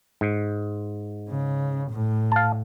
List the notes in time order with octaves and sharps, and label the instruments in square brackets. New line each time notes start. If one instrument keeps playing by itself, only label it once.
[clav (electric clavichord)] G#2
[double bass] C#3
A2
[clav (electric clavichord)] F5 A5